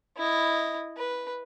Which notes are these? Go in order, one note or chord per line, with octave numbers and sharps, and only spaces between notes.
E4 D#5
B4